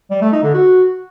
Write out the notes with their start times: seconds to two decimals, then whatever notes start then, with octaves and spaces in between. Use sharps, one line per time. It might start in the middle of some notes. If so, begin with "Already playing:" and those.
0.11 G3
0.22 A3
0.32 D#4
0.43 D3
0.54 F#4